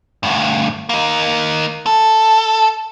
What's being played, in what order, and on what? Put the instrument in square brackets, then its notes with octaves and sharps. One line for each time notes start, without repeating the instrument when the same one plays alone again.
[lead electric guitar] D2 G2
A#3 D#4
A4